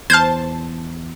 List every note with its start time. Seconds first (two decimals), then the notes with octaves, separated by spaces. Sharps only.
0.10 E2 C5 A5 F6 G6 G#6